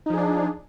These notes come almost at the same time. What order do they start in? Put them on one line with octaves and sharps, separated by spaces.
D#4 F3 G#4 D4